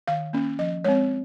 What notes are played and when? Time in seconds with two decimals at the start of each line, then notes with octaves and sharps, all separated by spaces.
0.08 D#3 F5
0.33 A#3 C#4
0.59 F3 D#5
0.84 G#3 C4 C#5